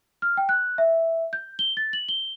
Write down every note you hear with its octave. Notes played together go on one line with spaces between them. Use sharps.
F6
G5
F#6
E5
G6
G7
A6
F#7
G7